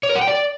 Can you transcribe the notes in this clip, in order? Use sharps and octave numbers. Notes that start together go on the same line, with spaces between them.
C#5
A#4
F#5
G5
D5